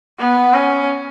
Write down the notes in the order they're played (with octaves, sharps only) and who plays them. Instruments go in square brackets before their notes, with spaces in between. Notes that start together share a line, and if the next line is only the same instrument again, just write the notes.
[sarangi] B3
C#4